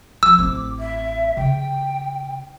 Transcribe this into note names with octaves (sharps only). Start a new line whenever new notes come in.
F3 E6
A1 C4 D6
E5
C#3 G5